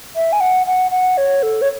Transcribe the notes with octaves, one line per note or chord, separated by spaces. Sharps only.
E5
G#5
F#5
F#5
F#5
C#5
A4
C#5